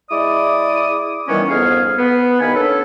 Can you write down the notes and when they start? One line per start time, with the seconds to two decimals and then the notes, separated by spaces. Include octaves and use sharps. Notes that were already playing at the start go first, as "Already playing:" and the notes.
0.11 G#3 E4 D5 D6 D#6
1.28 D#3 E3 G3 B3 C#4
1.50 F2 G#2 B3 G#4 F5
1.98 B3
2.40 C2 D#3 B3 F5 G#5 B5
2.55 B3 C#4 D4 A4